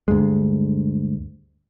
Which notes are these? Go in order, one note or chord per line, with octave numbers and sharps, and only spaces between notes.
D2 G2 G#3